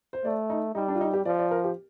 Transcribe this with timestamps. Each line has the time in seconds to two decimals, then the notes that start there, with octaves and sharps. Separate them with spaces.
0.13 C5
0.25 A3 D5
0.50 D#4
0.75 G3 D#4
0.88 D4
0.95 F4
1.01 D#4
1.13 G4
1.25 F3 D5
1.39 D5
1.51 A#4
1.64 G4